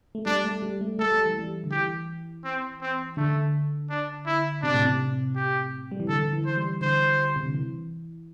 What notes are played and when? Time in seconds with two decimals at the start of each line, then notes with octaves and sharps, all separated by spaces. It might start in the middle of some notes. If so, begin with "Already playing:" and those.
0.15 A3
0.26 G3 D4
0.44 A3
0.62 G3
0.81 A3
0.99 A3 A4
1.12 G3
1.26 E3
1.39 G3
1.64 D3
1.71 E3 G4
2.44 C4
2.81 C4
3.17 D3 A3
3.90 D4
4.26 E4
4.62 C3 D4
4.74 A2
4.85 C3
5.36 G4
5.92 G3
6.00 E3
6.08 D3 A4
6.33 E3
6.46 C5
6.57 G3
6.81 D3 C5
7.36 C3
7.45 D3
7.55 E3